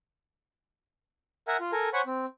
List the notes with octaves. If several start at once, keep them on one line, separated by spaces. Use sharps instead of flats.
A#4 E5 F#5 G#5
F4
A4 A#4 G#5
C5 C#5 F#5 G#5 B5 C#6
C4